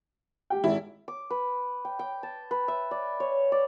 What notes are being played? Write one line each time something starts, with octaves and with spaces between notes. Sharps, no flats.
G4 G5
G#1 E4
D6
B4
G5
G5
A5
B4
E5
D5
C#5
D5